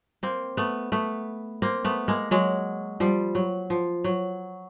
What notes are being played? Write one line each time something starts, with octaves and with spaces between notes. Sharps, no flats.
A#3 C4
A3 B3
A3 B3
A#3 C4
A3 B3
G#3 A#3
F#3 G#3
F3 G3
F#3
F3
F#3